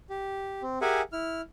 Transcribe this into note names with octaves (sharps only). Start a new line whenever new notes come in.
G4
C4
G4 G#4 A#4 E5 F#5 G#5
E4 F6